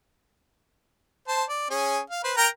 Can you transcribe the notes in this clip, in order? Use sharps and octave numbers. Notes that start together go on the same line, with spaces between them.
C5 A5
D5
C#4 G#4
F5
B4 C5
A#4 G5 A#5